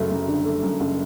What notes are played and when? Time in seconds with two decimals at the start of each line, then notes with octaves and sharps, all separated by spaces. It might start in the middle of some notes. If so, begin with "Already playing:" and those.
Already playing: F#1 F#2 A3
0.11 F#2
0.28 D3
0.45 A3
0.63 F#2
0.80 F#1